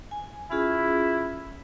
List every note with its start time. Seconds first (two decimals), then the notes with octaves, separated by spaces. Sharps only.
0.11 G#5
0.51 C#4 E4 F4 G#4